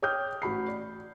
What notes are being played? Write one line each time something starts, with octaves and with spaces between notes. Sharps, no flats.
C#5 G5 D6 D#6 F6 G6
A1 F#4 B5 C7
D5